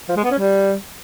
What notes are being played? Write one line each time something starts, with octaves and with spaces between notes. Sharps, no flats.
F3
G#3
B3
C#4
G3